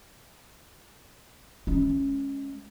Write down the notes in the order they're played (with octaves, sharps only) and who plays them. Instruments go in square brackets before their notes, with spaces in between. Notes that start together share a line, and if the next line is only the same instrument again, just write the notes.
[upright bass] G#3 C#4